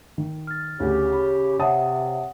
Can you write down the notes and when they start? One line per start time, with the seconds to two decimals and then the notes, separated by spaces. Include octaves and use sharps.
0.18 D#3
0.47 F6 A6
0.80 D2 C#3 G4
1.12 B5
1.59 C3 C#5 E5 F#5 A5 D#6